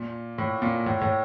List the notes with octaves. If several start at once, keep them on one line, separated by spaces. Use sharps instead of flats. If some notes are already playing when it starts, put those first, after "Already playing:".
Already playing: A#2
A2
A#2
A2
A2